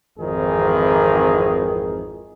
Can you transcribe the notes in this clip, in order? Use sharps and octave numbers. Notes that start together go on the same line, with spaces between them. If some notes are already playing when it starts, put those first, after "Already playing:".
G#1 F2 D#3 E3 G#4